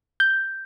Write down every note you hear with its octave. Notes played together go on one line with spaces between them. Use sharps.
G6